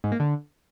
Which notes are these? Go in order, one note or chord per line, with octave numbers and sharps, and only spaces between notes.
G#2
A#3
D3